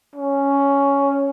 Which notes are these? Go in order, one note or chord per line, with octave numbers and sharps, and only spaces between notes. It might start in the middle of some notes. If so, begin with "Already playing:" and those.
C#4